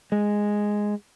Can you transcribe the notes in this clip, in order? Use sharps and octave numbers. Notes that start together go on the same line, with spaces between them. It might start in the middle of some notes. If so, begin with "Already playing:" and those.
G#3